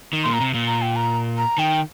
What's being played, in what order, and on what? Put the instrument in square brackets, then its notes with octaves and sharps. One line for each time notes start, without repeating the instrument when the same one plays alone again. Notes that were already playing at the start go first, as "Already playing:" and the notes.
[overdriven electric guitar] D#3
[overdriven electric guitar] A#2 [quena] C6
[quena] A#5
[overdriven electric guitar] C3
A#2
[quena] A#5
G5
A#5
A#5
[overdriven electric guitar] D#3 [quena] G5